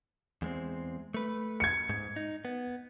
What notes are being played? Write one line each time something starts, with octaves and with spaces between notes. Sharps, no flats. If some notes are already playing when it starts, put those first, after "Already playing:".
E2 G#3 C4
A3 B4
G#6 C#7
G#2
D#4
B3